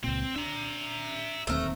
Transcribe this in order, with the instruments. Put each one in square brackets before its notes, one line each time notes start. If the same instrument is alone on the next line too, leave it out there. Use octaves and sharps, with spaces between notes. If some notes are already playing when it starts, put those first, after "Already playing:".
[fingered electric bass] C#2 A#2 [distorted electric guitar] C4
[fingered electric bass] D4 [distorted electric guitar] E5 A#5
[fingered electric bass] D1 D#2 C4 [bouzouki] A3 A#4